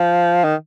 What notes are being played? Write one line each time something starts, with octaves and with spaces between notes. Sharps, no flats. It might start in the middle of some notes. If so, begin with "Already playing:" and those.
Already playing: F3
D#3